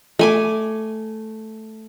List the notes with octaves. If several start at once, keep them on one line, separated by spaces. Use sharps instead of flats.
A3 G#5 D6